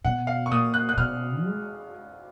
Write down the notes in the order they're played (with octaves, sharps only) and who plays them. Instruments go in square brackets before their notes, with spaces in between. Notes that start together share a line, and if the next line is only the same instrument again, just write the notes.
[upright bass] B2 [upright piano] F#5
[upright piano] F5
C#6
[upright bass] A#2 [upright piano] D#6
[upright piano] F#6
F#6
[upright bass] B2 [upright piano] F6
[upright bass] G#3